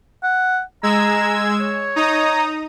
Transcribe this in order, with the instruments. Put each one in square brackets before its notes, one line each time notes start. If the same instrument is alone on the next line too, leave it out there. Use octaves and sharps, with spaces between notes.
[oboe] F#5
[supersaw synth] G#3 E6 G#6 [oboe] A#5
[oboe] C#5
[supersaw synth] D#4 A#5 D#6